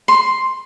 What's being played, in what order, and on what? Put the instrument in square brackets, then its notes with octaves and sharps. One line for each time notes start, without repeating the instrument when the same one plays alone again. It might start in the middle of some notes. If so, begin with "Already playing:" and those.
[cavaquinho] C6